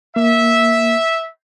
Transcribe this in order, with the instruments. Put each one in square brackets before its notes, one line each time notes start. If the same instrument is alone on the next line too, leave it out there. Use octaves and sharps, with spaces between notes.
[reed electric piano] A#3 [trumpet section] E5